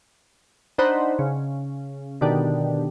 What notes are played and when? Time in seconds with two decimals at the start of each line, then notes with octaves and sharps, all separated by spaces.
0.78 D4 D#4 C5 F#5 B5
1.19 C#3
2.21 B2 D3 D#3 D4 G4